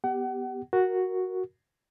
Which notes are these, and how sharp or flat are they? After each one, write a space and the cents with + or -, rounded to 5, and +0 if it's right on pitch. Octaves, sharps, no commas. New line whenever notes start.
B3 +0 G4 +0 F#5 +35
F#4 +0 A#4 +0